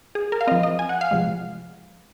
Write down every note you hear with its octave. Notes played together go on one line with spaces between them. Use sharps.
G#4
A#4
F5
F3 C4 D#5
D#5
G#5
F#5
F5
C3 F3 G#3